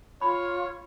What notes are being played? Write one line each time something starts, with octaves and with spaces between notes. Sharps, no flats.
F4 C#5 B5